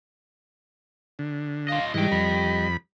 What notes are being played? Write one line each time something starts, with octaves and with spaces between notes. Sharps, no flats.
D3
F4 D#5 F5
G#2 E3 G3 D#5 G5
F2 B5